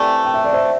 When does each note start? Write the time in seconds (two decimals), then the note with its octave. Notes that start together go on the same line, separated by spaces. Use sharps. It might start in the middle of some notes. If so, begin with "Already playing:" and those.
Already playing: C3 E3 A3 D5 G5
0.25 G5
0.34 E5
0.45 D5
0.53 C5 E5